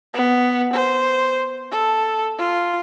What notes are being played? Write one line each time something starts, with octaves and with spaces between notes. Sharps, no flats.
B3
C5
A4
F4